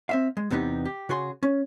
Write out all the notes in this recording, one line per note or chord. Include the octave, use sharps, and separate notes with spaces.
C4 E5 F5
G#3
E2 C3 B3 D#4 G4
G4
C#3 F#4 G#4 C6
C#4